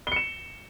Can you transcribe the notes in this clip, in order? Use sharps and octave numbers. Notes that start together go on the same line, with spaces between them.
C#7 E7 G7